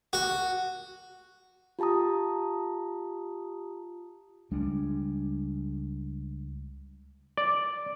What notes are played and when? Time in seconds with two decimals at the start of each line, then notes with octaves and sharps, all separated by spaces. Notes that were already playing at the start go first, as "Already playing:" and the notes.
0.13 F#4
1.79 F4 G4 A5 A#5 D#6
4.51 C#2 G3 G#3 D4
7.37 D5